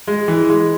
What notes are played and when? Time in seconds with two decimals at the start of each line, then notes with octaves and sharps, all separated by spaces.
0.07 G#3
0.28 E3
0.49 G#3